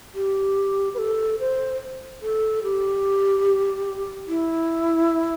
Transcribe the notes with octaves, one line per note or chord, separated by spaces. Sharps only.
G4
B4
A4
C5
A4
G4
E4